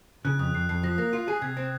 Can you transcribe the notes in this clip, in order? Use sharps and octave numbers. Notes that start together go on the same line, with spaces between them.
C#3 F#6
F2 D#6
F2 C7
F2 C7
F3 A#6
A#3 A#6
F4
G#4
C3 G#6
C4